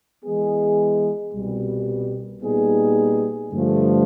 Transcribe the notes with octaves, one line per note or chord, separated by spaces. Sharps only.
E3 G#3 B3 E4 G#4
C2 B2 G3
A#2 G3 B3 D#4 G#4
G2 D3 F3 A3